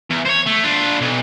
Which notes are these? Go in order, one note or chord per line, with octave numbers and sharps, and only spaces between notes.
E2
C5 C#5
A3
D4 F4
B1